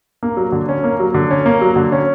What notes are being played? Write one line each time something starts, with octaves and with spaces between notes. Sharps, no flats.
A#3
F#3
D3
C#4
A#3
F#3
D3
C#4
A#3
F#3
D3
C#4